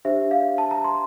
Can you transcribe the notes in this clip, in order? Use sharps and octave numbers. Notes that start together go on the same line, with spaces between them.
D4 G4 C5 E5
F5
A5
A#5
C6